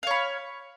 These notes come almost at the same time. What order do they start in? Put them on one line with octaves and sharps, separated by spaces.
F5 C#5 B5